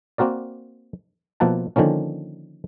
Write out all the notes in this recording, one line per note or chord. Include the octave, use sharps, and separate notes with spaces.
A#3 C4 F#4 A#4 D5
B2 F3 A#3 E4 F#5 A5
D3 D#3 F3 A#3 C#4